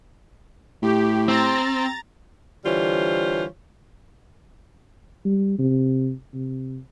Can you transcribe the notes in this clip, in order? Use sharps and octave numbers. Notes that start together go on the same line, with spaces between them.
A2 G4
C4 A#5 A6
D3 E3 G3 F4 C5 C#5
G3
C3
C3